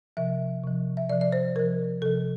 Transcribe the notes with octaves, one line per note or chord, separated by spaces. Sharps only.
C3 F3 E5
C3 F3
E5
C3 F3 D5
D5
C5
C3 F3 A#4
C3 F3 A4